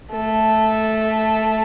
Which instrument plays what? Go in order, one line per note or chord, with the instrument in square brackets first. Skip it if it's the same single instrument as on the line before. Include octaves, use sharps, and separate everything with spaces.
[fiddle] A3